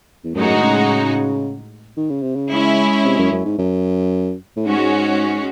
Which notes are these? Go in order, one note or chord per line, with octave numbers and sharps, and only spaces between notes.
E2
F#2 A2 G#3 D#4 F#4
D#3
C#3
D#3
C#3
C3
C#3
G#3 C#4 E4
C3
F#2
F#2
G#2
F#2
A2
G#2 G#3 C#4 F#4